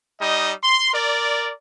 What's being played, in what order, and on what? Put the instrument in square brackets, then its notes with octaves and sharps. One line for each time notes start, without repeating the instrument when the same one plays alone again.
[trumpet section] G3 D#4 D#5
C6
A#4 D5